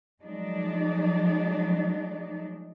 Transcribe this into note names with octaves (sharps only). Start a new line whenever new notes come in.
F3 F#3 G#3 A3 D4 D#4